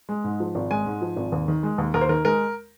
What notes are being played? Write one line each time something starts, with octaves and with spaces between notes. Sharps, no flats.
G#3
G#2
F3
G#1
G#3 G#5
G#2
F3
G#1
D#2
D#3
G#3
D#2
D#2 A#4
C5
D#3 A#4
G#3 A#4